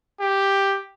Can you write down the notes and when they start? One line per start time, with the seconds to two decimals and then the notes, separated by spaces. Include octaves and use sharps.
0.21 G4